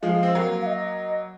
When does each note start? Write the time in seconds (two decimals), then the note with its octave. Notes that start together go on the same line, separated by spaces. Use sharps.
0.03 F3 G#3 F5
0.23 C4
0.35 F#3 A#3
0.61 F5
0.66 D#5